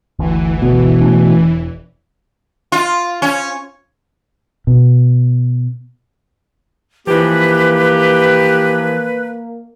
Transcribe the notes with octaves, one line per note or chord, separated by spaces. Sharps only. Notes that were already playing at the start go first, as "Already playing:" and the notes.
G1 D2 E3
B2
F1 A3 C#4
E1
F4
C#4
B2
E3 F3 A#3 G4 B4